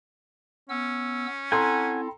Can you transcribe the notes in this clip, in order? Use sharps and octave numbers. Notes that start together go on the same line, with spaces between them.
B3 C#4 E6
C4 E4 A4 F#5 G#5 A#5 C6